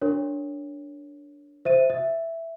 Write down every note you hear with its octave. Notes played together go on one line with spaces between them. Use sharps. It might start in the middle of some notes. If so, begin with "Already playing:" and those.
D4 A#4 C#5
C5 E5 D#7
E5